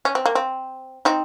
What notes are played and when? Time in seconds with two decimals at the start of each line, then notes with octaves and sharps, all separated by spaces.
0.05 C#4
0.15 C4
0.26 A#3
0.35 C4
1.05 C4 D#4